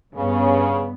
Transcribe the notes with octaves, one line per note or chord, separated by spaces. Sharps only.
G2 C#3 B3